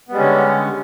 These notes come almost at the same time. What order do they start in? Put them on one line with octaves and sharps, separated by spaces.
B3 G3 G#3 C#4 D3